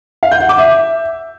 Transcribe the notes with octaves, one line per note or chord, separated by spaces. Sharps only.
F5
G6
F#5
D6
E5